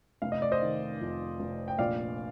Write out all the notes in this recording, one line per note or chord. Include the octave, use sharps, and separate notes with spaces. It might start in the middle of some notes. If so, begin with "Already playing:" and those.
F1 F5
D#5
D5
C5 D#5
D#3
F2
F1
G5
A#1 D5 F5